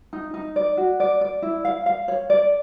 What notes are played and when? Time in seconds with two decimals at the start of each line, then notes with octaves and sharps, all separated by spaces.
0.13 D#4
0.34 D#4
0.56 D5
0.77 F#4
1.00 D5
1.21 D5
1.42 E4
1.65 F5
1.86 F5
2.08 C#5
2.30 D5